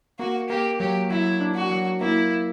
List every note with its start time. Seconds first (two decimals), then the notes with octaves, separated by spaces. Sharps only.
0.19 A#3 F#4
0.49 A#3 G4
0.80 F#3 G4
1.10 F#3 E4
1.40 D4
1.55 F#4
1.71 F#3
2.01 A#3 E4